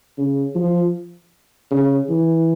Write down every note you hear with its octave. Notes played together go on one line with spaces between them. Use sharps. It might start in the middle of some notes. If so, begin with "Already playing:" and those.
C#3
F3
C#3
E3